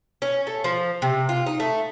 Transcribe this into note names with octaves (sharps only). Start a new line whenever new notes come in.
C#4
A3
F3
C3
F4
D#4
A3